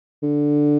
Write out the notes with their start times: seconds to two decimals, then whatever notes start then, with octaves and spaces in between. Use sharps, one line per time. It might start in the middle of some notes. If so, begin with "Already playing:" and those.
0.23 D3